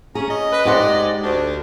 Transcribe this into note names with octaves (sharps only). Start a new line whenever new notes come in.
C#4 G#4 A#5
D#5
B4
G#2 G4 C5 D5 F#5
D2 D4